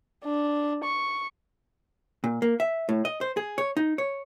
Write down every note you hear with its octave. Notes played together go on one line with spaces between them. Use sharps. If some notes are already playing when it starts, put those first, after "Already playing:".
D4
C#6
A#2
A#3
E5
A2
D#5
C5
G#4
C#5
D#4
C#5